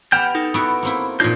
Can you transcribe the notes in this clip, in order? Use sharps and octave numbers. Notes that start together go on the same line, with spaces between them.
B3 G4 F#5 G5 F6 G6 E7 F7
D#4 A4
B3 E4 F#4 C#6 D7
A#3 C4 E4
A#2 F3 D4 D#4 F4 C#5 G6